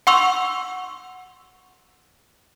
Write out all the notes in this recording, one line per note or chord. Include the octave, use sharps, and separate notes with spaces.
F#5 C6 C#6 E6 F7